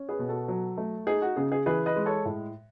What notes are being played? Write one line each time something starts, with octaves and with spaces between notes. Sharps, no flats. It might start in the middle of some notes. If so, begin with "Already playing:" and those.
Already playing: C#4
G#4 B4
B2
F#4 A4
F#3
A3
D#4 G#4
F#4
C#3 G#4
G#4
E3 G#4 B4
B4 D#5
G#3
A4 C#5
A2